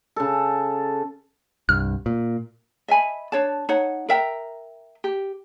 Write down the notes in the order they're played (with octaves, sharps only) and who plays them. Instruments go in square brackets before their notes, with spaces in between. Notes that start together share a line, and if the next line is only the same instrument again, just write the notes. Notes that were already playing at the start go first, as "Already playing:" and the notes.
[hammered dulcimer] C#3 A4
[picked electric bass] C2 G2 [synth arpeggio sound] F6
[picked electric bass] A#2
[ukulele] D#5 E5 G#5 B5
D4 C#5 A5
D#4 C#5 F#5
A#4 E5 G5 A#5
G4